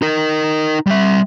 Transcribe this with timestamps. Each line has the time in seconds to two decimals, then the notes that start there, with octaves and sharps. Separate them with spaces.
0.02 D#4 A#4
0.87 G3 E5